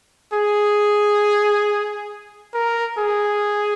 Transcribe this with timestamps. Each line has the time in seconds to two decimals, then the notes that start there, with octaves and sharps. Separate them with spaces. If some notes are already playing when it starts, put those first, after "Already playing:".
0.33 G#4
2.54 A#4
2.98 G#4